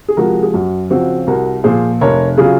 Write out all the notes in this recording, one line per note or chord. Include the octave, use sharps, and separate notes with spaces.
G#4
C3 F3 G#3 F#4 A#4
G#4
F#2 F#4
C#3 F3 C4 F#4
C2 F#4 A#4
A#2 F3 G#4 C5
F1 A#4 C#5
C#3 F#3 F4 G#4